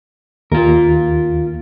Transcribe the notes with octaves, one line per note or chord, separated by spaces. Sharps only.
D#2 F4 A#4